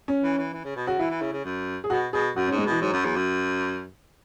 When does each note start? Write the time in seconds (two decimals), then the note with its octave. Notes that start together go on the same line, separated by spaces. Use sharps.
0.08 C#4
0.23 E3
0.38 E3
0.53 E3
0.65 C#3
0.76 B2
0.87 C#3 F#4
0.98 E3 E4
1.10 E3
1.21 C#3
1.33 C#3
1.45 F#2
1.84 G#4
1.90 B2 F#4
2.13 B2 G#4
2.36 F#2 F#4
2.47 C#4
2.51 G#2
2.58 G#3
2.66 B2 E3
2.81 G#2 F#3
2.93 F#2
3.04 E2
3.16 F#2